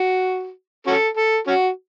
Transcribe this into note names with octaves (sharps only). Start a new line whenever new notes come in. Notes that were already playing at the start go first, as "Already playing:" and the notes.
Already playing: F#4
C#4 F#4 A4
A4
C#4 F#4